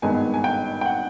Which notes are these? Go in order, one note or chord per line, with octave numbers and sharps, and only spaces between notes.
G#1 G2 D#3 G#3 B3 G#5
G#5
G5
G5
F#5